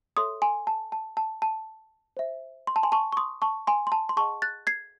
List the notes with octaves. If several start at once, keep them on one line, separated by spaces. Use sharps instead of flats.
A4 C#5 E5 C6 D#6
G#5 C6
A5
A5
A5
A5
C5 E5
C6
A5
G#5 C6
A5 C#6
C#6
C6 D#6
A5 C#6
G#5 C6
C6
A5
C6
G#4 D#5 F#5 A5 C#6
F#6 A6
G#6 C7